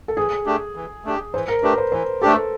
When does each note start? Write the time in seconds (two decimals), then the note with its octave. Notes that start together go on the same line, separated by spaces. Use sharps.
0.08 A4
0.17 E3 G#4
0.46 A3 D4 G4
0.75 E3
1.05 A3 D4 G4
1.34 E3 C5
1.48 A#4
1.63 A3 D4 G4 B4
1.78 C5
1.92 E3 C5
2.22 A3 D4 G4 A4